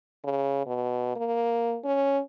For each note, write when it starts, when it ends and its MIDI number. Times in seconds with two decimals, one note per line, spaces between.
0.24 0.65 49
0.66 1.13 47
1.16 1.78 58
1.84 2.20 61